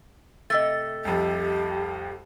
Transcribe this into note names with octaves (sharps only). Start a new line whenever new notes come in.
C3 A3 D#5 A6
C2 F2 G4